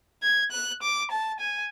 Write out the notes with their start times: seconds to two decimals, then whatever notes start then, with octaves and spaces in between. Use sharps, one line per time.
0.23 G#6
0.52 F#6
0.82 D6
1.11 A5
1.40 G#5